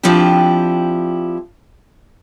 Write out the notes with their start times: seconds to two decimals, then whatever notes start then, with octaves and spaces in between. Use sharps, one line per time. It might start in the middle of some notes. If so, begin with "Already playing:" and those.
0.03 F3 C4 D4 E4 G4